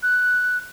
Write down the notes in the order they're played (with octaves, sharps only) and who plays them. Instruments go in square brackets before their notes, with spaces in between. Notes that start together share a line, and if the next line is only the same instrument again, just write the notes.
[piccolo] F#6